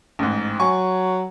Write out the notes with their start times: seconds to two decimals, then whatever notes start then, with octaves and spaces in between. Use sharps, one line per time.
0.19 A1 G#2
0.60 F#3 G#5 C#6